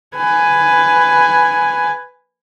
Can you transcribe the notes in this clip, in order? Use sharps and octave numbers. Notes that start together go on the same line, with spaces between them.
B4 G#5